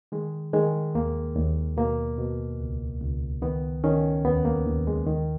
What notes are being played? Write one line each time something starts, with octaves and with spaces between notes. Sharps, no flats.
D#3 G#3
D#3 G#3
D#2 A#3
D#2
B2 A#3
B2
C#2
C#2
D#3 B3
D#3 C#4
D#2 B3
A#3
D#2
G#3
D#3